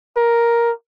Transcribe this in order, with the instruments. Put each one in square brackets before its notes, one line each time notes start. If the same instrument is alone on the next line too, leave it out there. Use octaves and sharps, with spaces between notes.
[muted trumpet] A#4